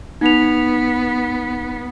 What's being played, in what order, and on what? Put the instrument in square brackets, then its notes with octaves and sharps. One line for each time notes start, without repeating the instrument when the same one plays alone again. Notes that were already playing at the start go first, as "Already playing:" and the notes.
[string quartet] B3 [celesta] D#4 F7